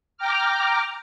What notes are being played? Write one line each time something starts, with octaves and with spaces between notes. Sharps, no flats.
G5 A#5 D6 F6